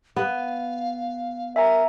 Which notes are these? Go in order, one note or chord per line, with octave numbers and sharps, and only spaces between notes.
B3 F5
A#4 E5 G#5 A#5